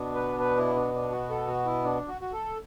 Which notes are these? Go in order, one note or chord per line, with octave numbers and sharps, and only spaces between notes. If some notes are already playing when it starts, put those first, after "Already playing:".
Already playing: B2 B3 D4
B4
B4
E4
D4
D4
F#4
A4
F#4
E4
D4
F#4
F#4
A4